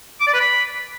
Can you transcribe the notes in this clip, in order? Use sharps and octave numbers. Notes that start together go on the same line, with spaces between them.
D6
D5
B4
B5